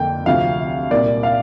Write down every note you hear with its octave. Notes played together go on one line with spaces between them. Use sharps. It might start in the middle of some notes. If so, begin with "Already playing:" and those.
Already playing: F2 D3 A#3 D4 G5
D2 C3 F3 F5
C2 A#2 A#3 D5
F5